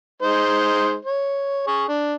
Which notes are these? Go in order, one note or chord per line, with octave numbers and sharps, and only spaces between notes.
G#3 D#4 C5
C#5
G#4 C#6
D4